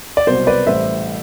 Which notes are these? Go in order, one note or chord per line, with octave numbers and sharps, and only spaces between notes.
D5
C2 B2 F#3 C5
B4 D5
A1 A2 G3 C5 E5